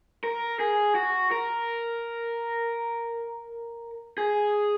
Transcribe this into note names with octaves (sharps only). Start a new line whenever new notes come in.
A#4
G#4
F#4
A#4
G#4